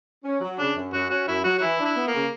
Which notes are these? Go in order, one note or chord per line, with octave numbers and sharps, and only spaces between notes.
C#4
F#3
C#3 D4
F#2
F#2 F#4
C#4 F#4
F#2 E4
F#3 F#4
F#4
E3 E4
D4
E4
B3
A#3
C#3